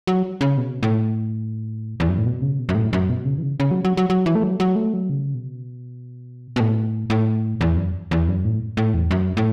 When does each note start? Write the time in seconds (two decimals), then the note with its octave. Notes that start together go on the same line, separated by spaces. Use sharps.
0.07 F#3
0.41 C#3
0.58 B2
0.83 A2
2.00 E2
2.09 F#2
2.18 A2
2.26 B2
2.42 C#3
2.59 B2
2.69 F#2
2.75 A2
2.93 F#2
3.10 B2
3.25 C#3
3.38 E3
3.43 C#3
3.60 C#3
3.71 F#3
3.85 F#3
3.97 F#3
4.10 F#3
4.26 E3
4.35 A3
4.43 F#3
4.60 F#3
4.76 A3
4.94 F#3
5.10 C#3
5.35 B2
6.56 B2
6.60 A2
7.10 A2
7.61 E2
7.77 F#2
8.11 E2
8.28 F#2
8.45 A2
8.77 A2
8.94 E2
9.11 F#2
9.37 A2